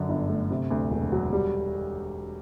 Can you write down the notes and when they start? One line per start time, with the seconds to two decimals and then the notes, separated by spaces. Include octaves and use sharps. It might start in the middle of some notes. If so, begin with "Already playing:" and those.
Already playing: F#2 D3
0.09 G1
0.29 A3
0.51 C3
0.70 D2
0.91 E1
1.12 F#3
1.33 G3